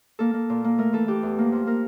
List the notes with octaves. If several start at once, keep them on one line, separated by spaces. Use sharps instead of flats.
A#3 A4
A#3
A#2
A#3
A3 A#4
E3 A4
E3 G4
E2
A#3
F3
A#3 A#4